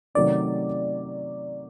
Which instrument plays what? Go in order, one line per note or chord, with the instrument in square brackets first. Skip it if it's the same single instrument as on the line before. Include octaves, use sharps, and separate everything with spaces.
[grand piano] C3 D#3 F#3 A3 C#4 [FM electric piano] D5